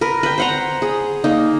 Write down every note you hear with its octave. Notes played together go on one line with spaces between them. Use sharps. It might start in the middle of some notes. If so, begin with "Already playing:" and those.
A#4 B4
B4 G5
C5 F#5 A#5
G#4
A#3 D#4